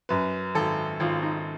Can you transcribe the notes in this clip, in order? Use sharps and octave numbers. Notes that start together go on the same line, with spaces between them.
F#2 B4
G#1 A4
G#1 F4
D#4